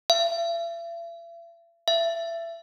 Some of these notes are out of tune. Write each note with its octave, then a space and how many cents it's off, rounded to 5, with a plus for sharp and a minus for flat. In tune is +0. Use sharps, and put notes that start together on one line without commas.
E5 +40
E5 +25